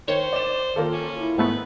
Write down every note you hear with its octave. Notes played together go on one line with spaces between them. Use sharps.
D#3 C5 C#5
D5 E7
D#3 A#3 F4 A4
C#4
E4
G#2 A3 B3 B4